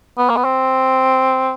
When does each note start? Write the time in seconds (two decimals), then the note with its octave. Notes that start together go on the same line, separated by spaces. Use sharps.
0.18 B3
0.30 A#3
0.37 B3
0.45 C4